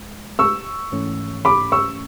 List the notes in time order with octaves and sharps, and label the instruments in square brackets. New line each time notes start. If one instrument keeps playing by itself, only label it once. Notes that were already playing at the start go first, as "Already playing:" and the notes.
Already playing: [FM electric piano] D2 G#3
[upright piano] C#6 E6
[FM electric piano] G#2 E3 A3 C#4
[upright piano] B5 D6
C#6 E6